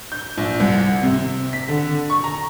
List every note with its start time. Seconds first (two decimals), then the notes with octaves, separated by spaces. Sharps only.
0.12 G6
0.37 A#1
0.60 C2
1.03 C3
1.53 B6
1.68 D3
2.10 C#6
2.24 A#5